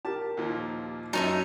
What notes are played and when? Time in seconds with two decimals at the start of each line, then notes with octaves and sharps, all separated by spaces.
0.05 G4 A#4 A5
0.37 D#2 A#2 F3
1.13 F#2 D#4 C#5 E5 A5 D#7